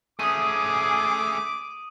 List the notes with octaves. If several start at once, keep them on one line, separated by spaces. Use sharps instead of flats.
A3 C#4 G#4 D6 D#6 D#7